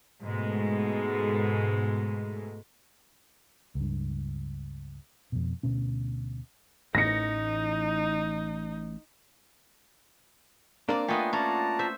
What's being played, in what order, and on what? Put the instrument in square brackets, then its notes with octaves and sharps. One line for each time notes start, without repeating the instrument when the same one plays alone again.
[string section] G#2 B2 G#3 A3
[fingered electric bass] C#2 G2
F2 B2
D2 B2 C#4
[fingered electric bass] A1 A2 E3 [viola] D#4 [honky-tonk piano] A#6 C#7
[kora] A#3 [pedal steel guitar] C4 D4 [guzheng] A#4 D5
[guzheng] A3 B3 D4 [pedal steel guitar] F4 D#5 [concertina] G5 G#5
[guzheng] C#4 [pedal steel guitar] F4 F#4 D5 [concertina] A5 A#5
[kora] C5 [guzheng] E5